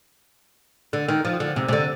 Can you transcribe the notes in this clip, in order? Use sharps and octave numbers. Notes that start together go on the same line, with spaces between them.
D3
D#3
F3
D3
C3
C3
D3